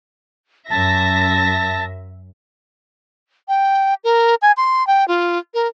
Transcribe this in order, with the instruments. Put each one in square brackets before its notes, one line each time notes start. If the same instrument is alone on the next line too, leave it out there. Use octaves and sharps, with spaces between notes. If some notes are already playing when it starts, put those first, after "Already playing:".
[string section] F#2 E5 A#6 [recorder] A5
[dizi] G5
A#4
G#5
C6
G5
F4
A#4